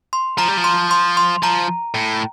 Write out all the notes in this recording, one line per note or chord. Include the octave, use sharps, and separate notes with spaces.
C6
F3 A#5
G3
F3
C6
C6
C6
F3 A#5
A2